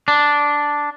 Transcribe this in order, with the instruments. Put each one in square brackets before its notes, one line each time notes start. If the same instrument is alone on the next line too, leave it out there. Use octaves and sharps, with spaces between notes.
[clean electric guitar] D4